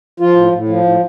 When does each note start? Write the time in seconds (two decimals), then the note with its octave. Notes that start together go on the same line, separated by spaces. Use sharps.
0.20 F3 F4
0.36 A2
0.52 A2
0.68 F3
0.85 A2